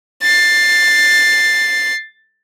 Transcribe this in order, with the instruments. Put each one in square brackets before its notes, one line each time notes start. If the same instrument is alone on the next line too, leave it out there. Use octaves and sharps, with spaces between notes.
[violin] A6 C7